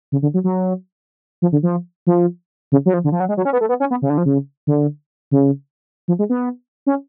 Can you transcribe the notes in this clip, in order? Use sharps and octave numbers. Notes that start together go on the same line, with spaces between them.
C#3
D3
F#3
F#3
F3
D3
F3
F3
C#3
F#3
F3
D3
F3
F#3
G#3
F#3
C#4
B3
A3
B3
C#4
B3
C#3
D3
F3
C#3
D3
C#3
F3
G#3
B3
C#4